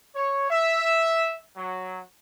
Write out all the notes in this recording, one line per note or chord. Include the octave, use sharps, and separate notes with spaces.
C#5
E5
F#3